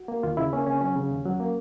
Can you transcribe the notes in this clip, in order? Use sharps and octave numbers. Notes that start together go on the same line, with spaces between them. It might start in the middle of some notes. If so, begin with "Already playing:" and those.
Already playing: F#4
A#3
D#2 F4
C#3 E4
A#3 C#4
C#3 C#4
F#3 C#4
C#3
D#2
F#3
A#3